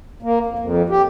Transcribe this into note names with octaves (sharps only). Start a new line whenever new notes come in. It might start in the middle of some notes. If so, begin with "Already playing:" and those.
A#3
F2
F2
G4